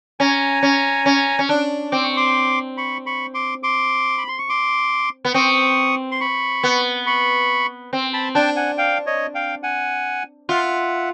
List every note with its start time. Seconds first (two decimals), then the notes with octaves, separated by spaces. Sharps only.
0.20 C#4 G#5 A#5
0.62 C#4
1.06 C#4
1.39 C#4
1.49 D4
1.92 C4 D6
2.04 C#6
2.17 C6 D6
2.77 B5 C#6
3.06 B5 C#6
3.34 C6 D6
3.63 C6 D6
4.18 B5
4.28 C6
4.39 C#6
4.49 C6 D6
5.25 B3
5.34 C4 C#6 D#6
6.11 C6
6.21 B5 C#6
6.63 B3
7.06 B5 C#6
7.93 C4
8.13 A5 B5
8.35 D4 G5 A5
8.56 F#5 G#5
8.78 F5 G5
9.06 C#5 D#5
9.35 F5 G5
9.63 F#5 G#5
10.49 F4 E5 F#5